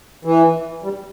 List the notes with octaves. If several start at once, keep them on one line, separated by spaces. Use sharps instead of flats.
E3
G3